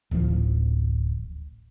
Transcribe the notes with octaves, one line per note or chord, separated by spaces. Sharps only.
D1 A1 F3